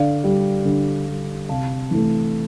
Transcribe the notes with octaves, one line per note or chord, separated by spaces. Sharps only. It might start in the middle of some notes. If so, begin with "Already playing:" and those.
Already playing: D3 D5 F5
G3
D3
G3
C3 F5 A5
E3 A3